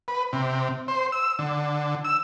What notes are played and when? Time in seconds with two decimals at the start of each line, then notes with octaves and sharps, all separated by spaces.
0.08 B4
0.33 C3
0.88 C5
1.12 E6
1.39 D3
2.05 E6